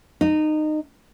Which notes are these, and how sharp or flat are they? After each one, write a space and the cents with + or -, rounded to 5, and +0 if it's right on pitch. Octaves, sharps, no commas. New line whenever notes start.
D#4 -20